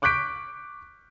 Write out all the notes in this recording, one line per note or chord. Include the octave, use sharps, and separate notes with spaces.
C#6 D6 F#6 G6 B6 D7